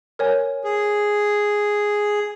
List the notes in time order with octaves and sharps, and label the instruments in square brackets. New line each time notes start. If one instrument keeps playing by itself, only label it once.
[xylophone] A#4 C#5 G#5
[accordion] G#4